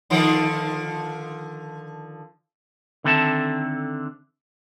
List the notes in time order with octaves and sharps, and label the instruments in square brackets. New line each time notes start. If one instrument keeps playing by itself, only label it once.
[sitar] D3 D#3 F3
[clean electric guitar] D3 D#3 C4 A4 E5 A5